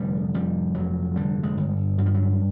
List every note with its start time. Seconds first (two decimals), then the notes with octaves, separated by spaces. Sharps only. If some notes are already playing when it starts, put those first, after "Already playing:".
Already playing: F1 D3 G3
0.34 F2 G3
0.74 F1 F#3
1.16 D3 G3
1.43 G#3
1.57 G1
1.98 G2 F#3
2.06 F3
2.14 F#3